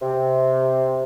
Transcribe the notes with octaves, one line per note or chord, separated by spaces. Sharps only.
C3